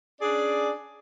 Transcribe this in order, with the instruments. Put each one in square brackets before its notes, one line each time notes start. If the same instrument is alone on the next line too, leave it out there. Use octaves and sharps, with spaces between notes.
[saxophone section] C#4 D4 G#4 D5